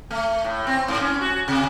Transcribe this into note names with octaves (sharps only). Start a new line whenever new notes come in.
A3
A2
C4
G#2
C#4
F#4
C3